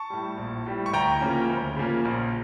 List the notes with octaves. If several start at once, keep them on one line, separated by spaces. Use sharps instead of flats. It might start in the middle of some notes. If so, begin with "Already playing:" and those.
Already playing: A5 C#6
A2 G3
A#1
A2 G3
C#6
D2 G5 A#5
C#3 F3 A#3 C#4
D2
C#3 F3 A#3 C#4
A#1